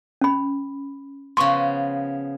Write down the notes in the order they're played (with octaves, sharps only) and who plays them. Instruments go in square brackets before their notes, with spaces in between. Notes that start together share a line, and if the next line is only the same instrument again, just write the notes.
[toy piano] C#4 B5
[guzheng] C#3 F3 B3 [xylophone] C6 C#6